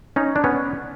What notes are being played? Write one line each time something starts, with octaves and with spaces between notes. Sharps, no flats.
C#4 D#4
D4
B3 C#4